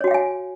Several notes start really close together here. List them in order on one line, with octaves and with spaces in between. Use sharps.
C#5 F#4 G5 F5 G#5